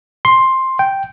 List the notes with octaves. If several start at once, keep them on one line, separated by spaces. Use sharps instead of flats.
C6
G5